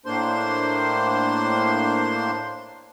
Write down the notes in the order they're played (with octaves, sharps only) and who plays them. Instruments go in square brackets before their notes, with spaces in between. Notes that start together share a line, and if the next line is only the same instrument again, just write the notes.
[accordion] A2 A#3 D4 C5 C6